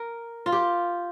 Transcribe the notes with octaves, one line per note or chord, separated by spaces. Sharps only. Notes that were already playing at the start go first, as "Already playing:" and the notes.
Already playing: A#4
F4
G4